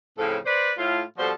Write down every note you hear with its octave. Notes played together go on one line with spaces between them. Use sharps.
F2 A2 C#3 F3 C4 A4
B4 C5 D5
A2 F4
B2 F3 G3 F#4 A4 C5